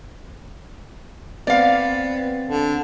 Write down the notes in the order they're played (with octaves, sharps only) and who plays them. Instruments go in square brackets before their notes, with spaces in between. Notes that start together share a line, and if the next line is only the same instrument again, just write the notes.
[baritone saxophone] B3 [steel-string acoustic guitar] C4 [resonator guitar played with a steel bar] D5 F5
[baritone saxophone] D3